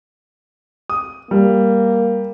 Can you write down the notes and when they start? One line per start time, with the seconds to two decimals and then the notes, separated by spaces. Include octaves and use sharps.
0.90 D#6
1.31 G3 A#3